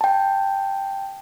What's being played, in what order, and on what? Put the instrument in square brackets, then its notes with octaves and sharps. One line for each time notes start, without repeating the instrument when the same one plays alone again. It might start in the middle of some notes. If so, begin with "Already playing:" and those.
[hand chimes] G5 A5